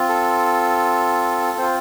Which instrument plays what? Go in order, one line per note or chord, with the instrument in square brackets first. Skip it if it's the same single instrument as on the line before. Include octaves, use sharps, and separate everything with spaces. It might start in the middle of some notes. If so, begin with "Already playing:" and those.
Already playing: [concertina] C4 F4
A4
C4 F4 C5